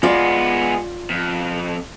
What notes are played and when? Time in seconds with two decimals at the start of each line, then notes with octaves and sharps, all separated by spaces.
0.03 G#3 B3 F4 D5
1.10 F2